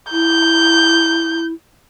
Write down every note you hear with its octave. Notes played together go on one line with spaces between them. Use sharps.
E4 G6